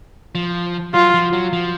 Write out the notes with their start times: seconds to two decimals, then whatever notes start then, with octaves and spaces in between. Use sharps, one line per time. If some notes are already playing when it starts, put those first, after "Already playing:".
0.35 F3
0.94 F#3 F4
1.14 F3
1.33 F#3
1.53 F3